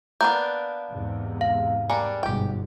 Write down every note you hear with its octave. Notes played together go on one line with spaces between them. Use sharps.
A#3 B3 D4 G6
E2 G#2 C3
F5
G3 A#3 D4 G#5
G1 G#2 B2 G4 G5